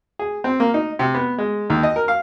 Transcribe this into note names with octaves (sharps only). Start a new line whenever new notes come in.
G#4
C4
A#3
D#4
C3
B3
G#3
D#2
D#5
A#4
F5